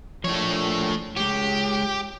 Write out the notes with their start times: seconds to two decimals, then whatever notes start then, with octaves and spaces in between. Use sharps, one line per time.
0.24 F3 A3 D4 C#5
1.17 G#3 G4 C#5